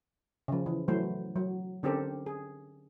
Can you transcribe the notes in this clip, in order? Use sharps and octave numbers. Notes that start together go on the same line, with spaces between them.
C#3 F3
E3
E3 F#3 A3 C5
F#3
D3 C4 C#4 G4 A4 A#4
G#4